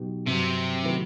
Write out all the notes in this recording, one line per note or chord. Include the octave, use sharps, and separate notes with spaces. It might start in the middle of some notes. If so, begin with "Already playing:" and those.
Already playing: B2 F#3 B3 D#4 G4
G2 C3 F#3 C4
D#3 F#3 A3 E4 B4